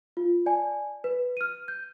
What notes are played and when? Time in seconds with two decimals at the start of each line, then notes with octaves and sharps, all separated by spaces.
0.17 F4
0.46 D5 G#5 A5
1.04 B4
1.37 F6 D#7
1.68 G6